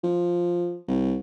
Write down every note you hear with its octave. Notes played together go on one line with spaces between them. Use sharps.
F3
C2